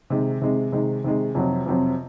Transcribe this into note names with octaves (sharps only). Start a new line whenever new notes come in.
C3 D#3 G#3
C3 D#3 G#3
C3 D#3 G#3
C3 D#3 G#3
F2 C3 F#3 C4
F2 C3 F#3 C4